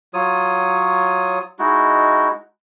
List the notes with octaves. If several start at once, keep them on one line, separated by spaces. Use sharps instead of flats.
F#3 F4 C#5 D#6
G#3 D#4 E4 F#4